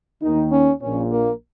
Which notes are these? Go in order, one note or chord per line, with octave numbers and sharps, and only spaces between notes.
D#2 D#3 D#4
C#4
A#1 A#2 C#4
A#3